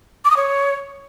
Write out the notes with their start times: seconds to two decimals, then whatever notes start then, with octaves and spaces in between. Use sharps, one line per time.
0.25 D6
0.31 D#6
0.37 C#5